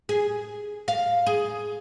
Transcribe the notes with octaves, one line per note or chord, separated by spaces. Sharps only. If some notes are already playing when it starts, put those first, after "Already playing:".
G#4
F5
G#4